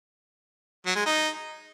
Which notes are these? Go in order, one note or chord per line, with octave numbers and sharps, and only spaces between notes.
F#3
G#3
D#4